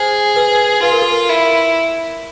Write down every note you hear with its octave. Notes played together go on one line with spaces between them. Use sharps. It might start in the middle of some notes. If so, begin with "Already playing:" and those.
Already playing: G#4 C5
B4
F4 B4
A#4
A4
A#4
E4